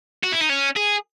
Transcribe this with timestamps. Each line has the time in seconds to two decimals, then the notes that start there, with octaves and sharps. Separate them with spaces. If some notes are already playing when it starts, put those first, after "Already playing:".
0.24 F#4
0.33 E4
0.41 D#4
0.50 C#4
0.77 G#4